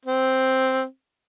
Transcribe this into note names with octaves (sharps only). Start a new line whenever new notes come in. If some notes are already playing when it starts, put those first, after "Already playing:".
C4